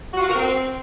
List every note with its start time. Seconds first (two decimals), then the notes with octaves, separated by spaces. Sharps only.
0.14 F#4
0.19 F4
0.24 F#4
0.30 A#4
0.35 C4